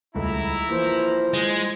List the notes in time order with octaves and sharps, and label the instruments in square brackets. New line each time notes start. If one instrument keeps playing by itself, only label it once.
[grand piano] D#1 C#2 A3 [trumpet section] E4 A#5
[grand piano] E3 F3 A#3 [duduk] C5
[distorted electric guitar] G#3